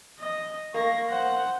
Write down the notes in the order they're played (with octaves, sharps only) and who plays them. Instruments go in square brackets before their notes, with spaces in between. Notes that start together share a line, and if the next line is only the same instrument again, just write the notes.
[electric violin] D#5
[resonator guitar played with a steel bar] A#3 [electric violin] C#6 A#6
[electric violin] C5 F#5